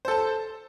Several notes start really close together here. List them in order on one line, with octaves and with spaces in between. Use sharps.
C5 A4 A5